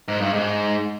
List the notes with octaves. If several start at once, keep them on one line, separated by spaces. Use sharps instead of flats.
G#2
G2
G#2